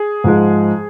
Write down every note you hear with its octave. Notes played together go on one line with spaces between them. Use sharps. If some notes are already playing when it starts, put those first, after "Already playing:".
Already playing: G#4
G#2 F3 G#3